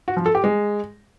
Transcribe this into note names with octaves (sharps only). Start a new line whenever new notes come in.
F#4
F3
A4
G4
G#3